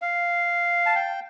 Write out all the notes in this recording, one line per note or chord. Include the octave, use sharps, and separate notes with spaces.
F5
A5
G5